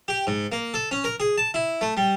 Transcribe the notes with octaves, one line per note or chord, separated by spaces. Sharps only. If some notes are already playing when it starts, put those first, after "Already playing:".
G4
G#2
A#3
A4
C#4
A#4
G#4
A5
E4
A3
G3